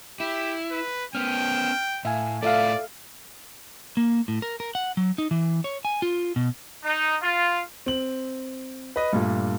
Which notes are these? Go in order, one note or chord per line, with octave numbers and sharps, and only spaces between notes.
E4 G4
B4
B3 C#4 G5 F6
A2 E5 F5 G#5
A2 F4 A4 D5 E5 F5
A#3
A2
A#4
A#4
F#5
F#3
D#4
E3
C#5
G#5
F4
B2
D#4
F4
C4 F#7
B4 D#5
G2 A#2 A3